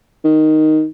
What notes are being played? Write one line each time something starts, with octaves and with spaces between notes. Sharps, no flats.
D#3